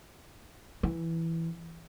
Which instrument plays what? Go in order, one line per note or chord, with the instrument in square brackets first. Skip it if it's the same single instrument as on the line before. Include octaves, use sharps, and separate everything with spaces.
[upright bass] E3